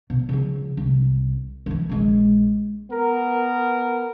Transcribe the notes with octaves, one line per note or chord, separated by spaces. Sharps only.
B2
C#3 F3
C2
E3 F#3
A#1 G#3
B3 A#4